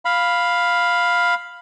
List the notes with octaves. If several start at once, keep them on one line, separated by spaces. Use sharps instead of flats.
F5 B5